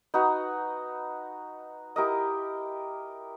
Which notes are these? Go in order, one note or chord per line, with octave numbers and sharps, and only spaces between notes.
D#4 F#4 B4
E4 G4 A#4 D#5